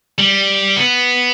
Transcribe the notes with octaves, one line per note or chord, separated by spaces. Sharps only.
G3
B3